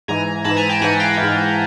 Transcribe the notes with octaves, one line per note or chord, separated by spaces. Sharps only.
G#2 E3 G#5 A#5
G#2 E3 A5 B5
G#5 A#5
G5 A5
G#2 E3 F#5 G#5
F5 G5
G#2 E3